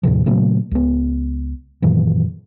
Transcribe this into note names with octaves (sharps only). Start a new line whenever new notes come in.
D#2 A2 C3 F3
A#2 C#3 F#3 A3
C#2 B3
F#2 A#2 D#3 E3